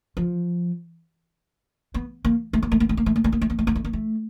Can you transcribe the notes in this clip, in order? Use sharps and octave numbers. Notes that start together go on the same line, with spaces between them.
F3
B3
A#3
A3
A#3
A3
A#3
A3
A#3
A3
A#3
A3
A#3
A3
A#3
A3
A#3
A3
A#3
A3